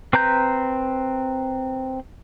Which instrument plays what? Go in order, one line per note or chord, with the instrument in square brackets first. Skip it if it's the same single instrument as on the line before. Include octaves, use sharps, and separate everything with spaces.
[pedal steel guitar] C4 B4 A#5 G6